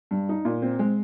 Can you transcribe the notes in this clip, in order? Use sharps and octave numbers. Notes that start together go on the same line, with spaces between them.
G2
D#4
A#2
C4
G#3